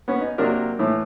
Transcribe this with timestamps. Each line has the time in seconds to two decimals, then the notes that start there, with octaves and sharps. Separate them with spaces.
0.08 B3 C#4
0.20 D#4
0.38 C3 F#3 A#3 D4 A#4
0.79 A2 E3